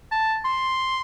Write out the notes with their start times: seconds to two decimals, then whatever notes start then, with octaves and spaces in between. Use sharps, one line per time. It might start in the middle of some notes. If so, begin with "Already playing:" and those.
0.12 A5
0.45 C6